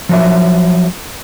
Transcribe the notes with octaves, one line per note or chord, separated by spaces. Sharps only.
F3 F#3 E5